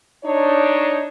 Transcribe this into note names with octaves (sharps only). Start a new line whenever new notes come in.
D4 D#4 C#5